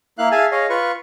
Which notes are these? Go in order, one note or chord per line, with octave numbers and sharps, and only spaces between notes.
A#3 E4 F5 F#6
G#4 E5 F5 G#5 A5
G#4 C#5 D#5 F5
F4 B4 C#6